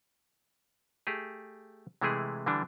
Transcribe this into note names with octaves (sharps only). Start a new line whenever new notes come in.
A3 G4 G#4
C3 E3 G#3 A3 E4 G#4
D3 E3 G3 D4